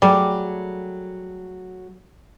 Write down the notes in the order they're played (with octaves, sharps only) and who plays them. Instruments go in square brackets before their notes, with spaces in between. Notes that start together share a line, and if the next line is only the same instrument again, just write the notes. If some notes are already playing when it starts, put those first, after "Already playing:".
[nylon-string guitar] F#3 A3 G#4 [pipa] G3